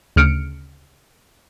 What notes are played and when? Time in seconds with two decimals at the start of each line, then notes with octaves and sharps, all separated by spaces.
0.16 D2 C#3 F6 C#7 D7